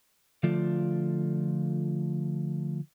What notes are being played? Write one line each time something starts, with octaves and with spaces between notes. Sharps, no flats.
D3 F3 A3 F4 D5